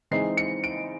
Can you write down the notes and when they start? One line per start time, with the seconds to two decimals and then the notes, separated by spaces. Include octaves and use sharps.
0.11 E3 G#3 C4 D#4 C7
0.37 C#7
0.64 D7